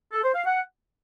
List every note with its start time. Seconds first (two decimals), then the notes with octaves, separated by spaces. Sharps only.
0.13 A4
0.24 C5
0.34 F5
0.45 F#5